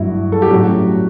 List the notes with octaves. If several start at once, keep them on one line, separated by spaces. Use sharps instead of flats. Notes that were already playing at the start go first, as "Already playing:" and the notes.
Already playing: G2 F#3 A3 E4 F#4
A4
G4
A2 F#3 A3 C#4 F#4